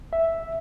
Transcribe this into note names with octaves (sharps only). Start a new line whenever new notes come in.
E5